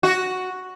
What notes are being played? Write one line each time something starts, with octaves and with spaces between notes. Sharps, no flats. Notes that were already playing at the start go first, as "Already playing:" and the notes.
F#4